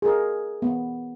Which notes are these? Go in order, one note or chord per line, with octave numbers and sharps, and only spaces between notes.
G#4 A#4
B3